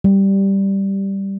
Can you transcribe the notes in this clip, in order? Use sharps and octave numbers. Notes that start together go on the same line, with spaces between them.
G3